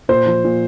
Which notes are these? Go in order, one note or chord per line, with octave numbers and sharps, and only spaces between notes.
A#2 C5
F3
A#2